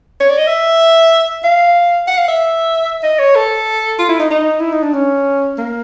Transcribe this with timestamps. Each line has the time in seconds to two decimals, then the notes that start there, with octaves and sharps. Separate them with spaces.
0.21 C#5
0.30 D5
0.38 D#5
0.47 E5
1.44 F5
2.07 F#5
2.18 F5
2.28 E5
3.03 D#5
3.19 C#5
3.36 A4
3.99 F4
4.09 E4
4.20 D#4
4.31 D#4
4.60 E4
4.72 D#4
4.83 D4
4.94 C#4
5.58 A#3